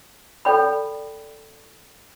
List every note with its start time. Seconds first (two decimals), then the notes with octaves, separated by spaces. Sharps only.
0.45 A4 D5 G5 B5